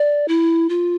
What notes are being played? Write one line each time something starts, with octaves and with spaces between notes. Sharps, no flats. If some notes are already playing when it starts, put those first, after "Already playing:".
Already playing: D5
E4
F4